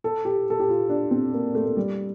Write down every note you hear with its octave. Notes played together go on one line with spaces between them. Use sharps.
A4
G4
A4
G4
F4
D4
C4
A#3
A3
A3
G3